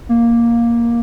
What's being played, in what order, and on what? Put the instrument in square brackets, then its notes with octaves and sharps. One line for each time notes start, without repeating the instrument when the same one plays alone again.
[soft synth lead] A#3